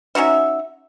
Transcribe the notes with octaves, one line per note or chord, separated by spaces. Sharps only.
C#4 D#4 F#4 E5